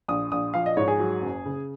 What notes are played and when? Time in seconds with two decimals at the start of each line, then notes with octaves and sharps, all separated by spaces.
0.08 A#1 D#6
0.32 A#1 D#6
0.54 F3 F5
0.66 D#5
0.77 G#2 C#5
0.88 G#4
1.00 F#3
1.22 F#1
1.45 C#3